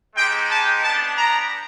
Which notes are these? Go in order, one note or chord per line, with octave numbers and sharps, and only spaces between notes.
G#3 C4 D#4 G4 G5
A5
B3 D4 G4 A5
A#5